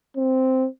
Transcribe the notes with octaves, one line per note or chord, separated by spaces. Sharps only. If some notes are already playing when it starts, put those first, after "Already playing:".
C4